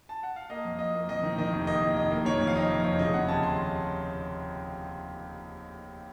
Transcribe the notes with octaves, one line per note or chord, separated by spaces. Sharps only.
A5
F#5
F5
A#3 D#5
F2
F2 D#5
A#3
F2 D#5
D#3
D#3 D#5
F1
A#3 D#5
D#3
F1 D#5
A#3
D#3 C#5
F2
F5
F1 D#5
F2
F1 C#5
C#3 D#5
F1 F#5
D#2 A5
C6